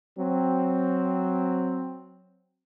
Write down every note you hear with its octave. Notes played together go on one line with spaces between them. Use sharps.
F#3 C4